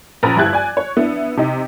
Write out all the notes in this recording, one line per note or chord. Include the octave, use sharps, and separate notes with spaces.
A#1 C#4 B4 A#5
G1 E4 G4 F#6 G#6
D5 G#5
C#5
B3 D4 E4
C3 D#4